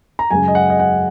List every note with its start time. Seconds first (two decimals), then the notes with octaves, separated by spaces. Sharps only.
0.19 A#5
0.31 F#2 C#3 G#3 G#5
0.48 D#5
0.55 F#5
0.70 D#5
0.80 F#5